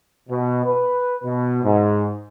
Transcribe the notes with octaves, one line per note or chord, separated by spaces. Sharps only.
B2
B4
B2
G#2